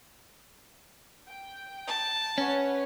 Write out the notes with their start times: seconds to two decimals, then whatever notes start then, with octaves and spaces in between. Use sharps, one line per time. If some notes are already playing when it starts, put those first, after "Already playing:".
1.27 G5
1.87 A5
2.38 C#4 B4 C#5 F#5